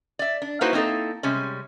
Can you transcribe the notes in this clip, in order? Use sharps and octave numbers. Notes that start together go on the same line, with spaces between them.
D5 E5
D4
A#3 D#4 E4 F#4 B4 C5
A#3 C4 D#4 E4 A4
C3 G3 G#3 C#4